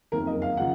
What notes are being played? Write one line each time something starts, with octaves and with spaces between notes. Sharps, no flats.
F#1 F2 D#3 A#4
D#5
F5
C#3 F3 F#5